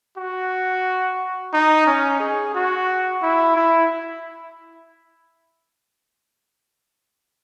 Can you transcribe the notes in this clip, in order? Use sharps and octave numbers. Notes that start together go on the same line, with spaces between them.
F#4
D#4
C#4
G#4
F#4
E4
E4